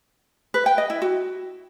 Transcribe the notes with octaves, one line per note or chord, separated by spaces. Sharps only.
B4
G5
D#5
E4
F#4